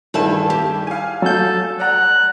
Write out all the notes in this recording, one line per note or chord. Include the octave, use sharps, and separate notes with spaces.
G2 D#3 E4 G#4 A4 A5
G4
F5 G#5
F#3 A4 G6
D5 F#5 A#5 F#6